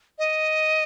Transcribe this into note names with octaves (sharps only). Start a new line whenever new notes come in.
D#5